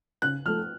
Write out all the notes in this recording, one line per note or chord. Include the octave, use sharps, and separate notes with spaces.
C#3 F#6
F3 A3 F6